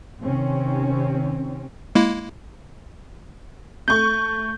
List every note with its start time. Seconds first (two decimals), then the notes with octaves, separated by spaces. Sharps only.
0.23 C3 D#3 C4 C#4
1.95 G#3 A#3 E4
3.88 A3 C#6 G6